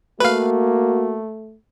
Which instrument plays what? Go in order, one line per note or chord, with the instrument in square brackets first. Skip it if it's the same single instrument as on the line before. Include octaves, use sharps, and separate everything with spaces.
[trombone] A3 [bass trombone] A#3 [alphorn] F#4 [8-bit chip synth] B4 F5